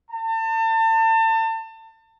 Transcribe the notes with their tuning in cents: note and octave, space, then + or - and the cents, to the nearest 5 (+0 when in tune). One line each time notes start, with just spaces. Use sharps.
A5 +35